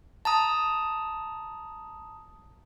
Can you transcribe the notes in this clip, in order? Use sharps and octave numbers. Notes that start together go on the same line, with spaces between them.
A5 A#5 D#6